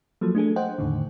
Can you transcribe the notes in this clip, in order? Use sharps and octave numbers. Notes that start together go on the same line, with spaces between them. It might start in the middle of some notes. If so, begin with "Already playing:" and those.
F3 F#3 A#3 A4
A3 D4 G#4 A4
C5 D#5 F#5 G5
E2 A2 D3 D#3